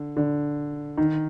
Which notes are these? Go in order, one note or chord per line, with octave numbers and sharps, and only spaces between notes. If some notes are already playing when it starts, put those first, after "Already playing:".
Already playing: D3
D3
D#3